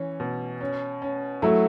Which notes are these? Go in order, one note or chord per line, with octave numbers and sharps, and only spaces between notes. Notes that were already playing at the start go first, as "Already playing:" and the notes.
Already playing: E3 C#4
B2
C#4
C#4
F#3 A3 E4